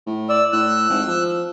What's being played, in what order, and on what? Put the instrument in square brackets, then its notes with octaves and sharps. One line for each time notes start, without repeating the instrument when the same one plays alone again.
[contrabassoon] A2
[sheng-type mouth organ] D5 E6
[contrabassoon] A2 [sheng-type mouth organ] E6 F#6
[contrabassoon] G#1
F3